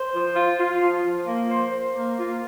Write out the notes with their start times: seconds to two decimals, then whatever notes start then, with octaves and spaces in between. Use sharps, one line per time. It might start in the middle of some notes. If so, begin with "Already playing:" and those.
Already playing: C5
0.13 F3
0.36 F4
0.59 F4
0.81 F3
1.03 F3
1.27 A#3
1.50 C5
1.71 C5
1.94 A#3
2.17 F4